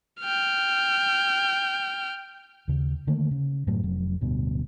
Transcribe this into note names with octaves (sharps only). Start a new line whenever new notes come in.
G5 F6
D#2 C#3
D3 D#3 A3 A#3
C#3
F#2 A2 F#3
F1 F2 F#3
D1 D2 G2 B2